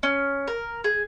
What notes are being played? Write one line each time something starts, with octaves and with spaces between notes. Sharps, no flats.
C#4
A#4
G#4